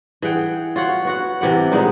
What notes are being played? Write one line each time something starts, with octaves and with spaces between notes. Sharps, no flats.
E3 G#4 F#5 G5
F4 F#4 C#5 F#5
B3 F#4 F#5
C3 E3 G4 F#5
A#2 G#3 B3 D#4